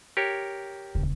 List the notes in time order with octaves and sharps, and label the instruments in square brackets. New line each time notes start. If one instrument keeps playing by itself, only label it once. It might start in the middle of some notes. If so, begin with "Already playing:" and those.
[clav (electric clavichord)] G4 A#4 C#5
[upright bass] D#1 C#2